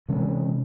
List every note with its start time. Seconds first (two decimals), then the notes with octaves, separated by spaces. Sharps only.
0.09 C3 E3 G#3 C#4